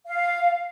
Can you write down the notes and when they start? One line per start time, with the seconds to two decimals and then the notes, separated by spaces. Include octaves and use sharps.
0.06 F5